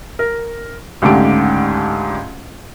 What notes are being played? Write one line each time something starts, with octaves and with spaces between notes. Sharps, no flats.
A#4
C#2 G#2 D3 A3 G4 D7